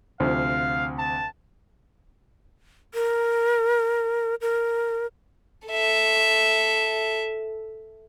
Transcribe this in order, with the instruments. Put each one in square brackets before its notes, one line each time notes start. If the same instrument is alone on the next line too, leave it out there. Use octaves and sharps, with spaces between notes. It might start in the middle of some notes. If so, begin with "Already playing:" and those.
[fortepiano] D2 C3 F3 [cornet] F5
[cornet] A5
[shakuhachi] A#4
A#4
[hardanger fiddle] A4 E5